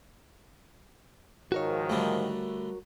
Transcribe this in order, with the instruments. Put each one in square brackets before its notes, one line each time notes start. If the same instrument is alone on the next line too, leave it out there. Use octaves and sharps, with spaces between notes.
[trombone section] G#2 D#3 F3 [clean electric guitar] F#4 A#4 C#5
[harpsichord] D3 G3 A3